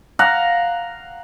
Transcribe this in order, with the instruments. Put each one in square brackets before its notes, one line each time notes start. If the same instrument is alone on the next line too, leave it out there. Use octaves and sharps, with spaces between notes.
[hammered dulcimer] F5 F#5 A#5